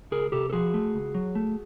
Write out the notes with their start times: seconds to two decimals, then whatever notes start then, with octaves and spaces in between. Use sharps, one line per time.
0.11 C#2 G#4 A#4
0.32 C3 G4 A4
0.50 A4
0.53 F3 F#4 G#4
0.74 A3
0.94 C#2
1.15 F#3
1.35 A3